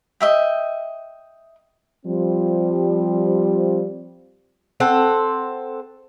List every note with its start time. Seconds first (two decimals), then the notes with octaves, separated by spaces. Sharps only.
0.20 D#5 E5 G5
2.06 F3 G3 C4
4.80 C4 A4 F#5